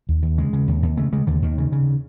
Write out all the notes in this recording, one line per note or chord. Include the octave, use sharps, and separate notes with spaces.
D#2
D#2
C#3 G#3
C#3
D#2
D#2
C#3 A3
C#3 G#3
D#2 D3
D#2 D#3
C#3
C#3